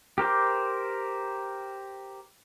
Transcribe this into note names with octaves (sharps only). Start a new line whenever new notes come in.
G4 A#4 C5 D6